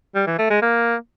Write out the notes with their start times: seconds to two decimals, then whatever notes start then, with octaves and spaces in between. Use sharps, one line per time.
0.15 G3
0.27 E3
0.38 A3
0.50 G#3
0.62 A#3